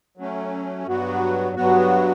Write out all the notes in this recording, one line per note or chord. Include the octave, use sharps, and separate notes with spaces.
F#3 A3 C#4
G2 F#3 B3 F#4
G2 F#3 B3 F#4